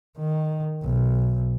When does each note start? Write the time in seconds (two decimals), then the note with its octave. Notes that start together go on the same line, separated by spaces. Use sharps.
0.18 D#3
0.83 B1